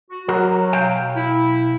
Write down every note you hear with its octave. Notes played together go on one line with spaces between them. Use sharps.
F#4
F#3 F#4 A#4
B1 F5 G5
E4